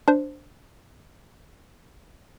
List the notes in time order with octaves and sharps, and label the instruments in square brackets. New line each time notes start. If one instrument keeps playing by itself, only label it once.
[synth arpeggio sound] D4 C5